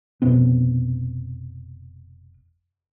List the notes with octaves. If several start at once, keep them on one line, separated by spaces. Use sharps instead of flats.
F1 B2 B3 C4